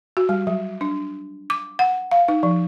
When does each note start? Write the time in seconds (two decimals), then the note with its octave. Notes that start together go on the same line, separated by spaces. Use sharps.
0.17 F#4
0.29 G3
0.47 F#3
0.81 D4
1.50 D6
1.79 F#5
2.11 F5
2.28 D#4
2.43 F3